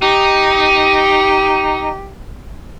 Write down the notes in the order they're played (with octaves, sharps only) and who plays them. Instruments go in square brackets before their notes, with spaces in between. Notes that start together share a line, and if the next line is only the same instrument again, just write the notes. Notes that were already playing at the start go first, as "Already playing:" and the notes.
[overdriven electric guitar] D#4 [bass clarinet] G4